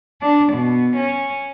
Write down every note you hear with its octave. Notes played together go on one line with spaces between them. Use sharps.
D4
B2
C#4